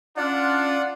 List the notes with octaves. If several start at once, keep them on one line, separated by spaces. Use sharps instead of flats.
C#4 D4 F4 D5 F#5